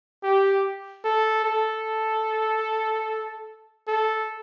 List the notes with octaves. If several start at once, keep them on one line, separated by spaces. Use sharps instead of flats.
G4
A4
A4
A4